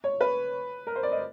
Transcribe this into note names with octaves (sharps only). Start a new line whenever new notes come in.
C#5
B4
A#4
C5
D5
D#5